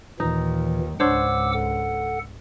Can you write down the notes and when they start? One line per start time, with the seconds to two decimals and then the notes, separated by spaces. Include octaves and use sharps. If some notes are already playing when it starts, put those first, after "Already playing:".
0.20 D#2 A#2 E3 D#4
1.00 C#2 G#2 D4 C5 C#5 F#5 D6 E6
1.53 A4 F#5